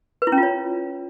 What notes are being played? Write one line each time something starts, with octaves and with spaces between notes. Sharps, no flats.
B4
E4
C#4
F4
C#5